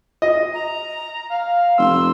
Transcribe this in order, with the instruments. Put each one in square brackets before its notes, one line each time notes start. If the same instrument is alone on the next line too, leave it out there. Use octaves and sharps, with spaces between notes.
[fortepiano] D#5
[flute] A#5
[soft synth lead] F5
[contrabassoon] F1 [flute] C6 [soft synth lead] E6